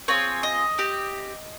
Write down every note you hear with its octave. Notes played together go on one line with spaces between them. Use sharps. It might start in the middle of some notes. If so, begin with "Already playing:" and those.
C4 F4 G#4 C#5
D#5
C4 G4